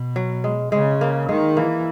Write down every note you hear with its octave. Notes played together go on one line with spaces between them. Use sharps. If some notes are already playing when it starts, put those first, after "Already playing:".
Already playing: B2
F#3
G#3
C#3 G#3
A#3
D#3 G#3
E3 A#3